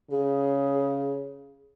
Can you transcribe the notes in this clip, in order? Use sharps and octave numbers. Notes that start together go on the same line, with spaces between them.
C#3 G#4